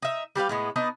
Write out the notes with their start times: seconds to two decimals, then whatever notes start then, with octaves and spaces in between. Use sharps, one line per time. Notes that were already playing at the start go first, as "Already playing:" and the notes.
0.02 D#4 E5
0.36 G3 G4 B4 F5
0.49 A2 G#3 B3
0.76 B3 D4 D#4 D#5